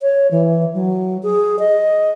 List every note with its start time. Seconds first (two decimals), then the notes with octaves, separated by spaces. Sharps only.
0.02 C#5
0.31 E3
0.74 F#3
1.23 G#4
1.59 D#5